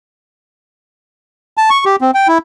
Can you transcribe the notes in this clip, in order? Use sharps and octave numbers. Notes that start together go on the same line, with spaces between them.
A5
C#6
G4
C4
G5
E4